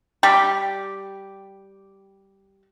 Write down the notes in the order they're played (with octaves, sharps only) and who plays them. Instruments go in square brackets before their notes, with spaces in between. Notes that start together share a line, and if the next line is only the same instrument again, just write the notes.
[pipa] G3 G4